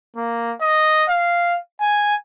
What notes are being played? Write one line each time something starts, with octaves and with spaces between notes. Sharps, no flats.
A#3
D#5
F5
G#5